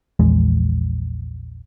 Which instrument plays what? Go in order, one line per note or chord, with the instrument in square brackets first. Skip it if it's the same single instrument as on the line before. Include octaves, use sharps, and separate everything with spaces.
[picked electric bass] A#1 E2 G#3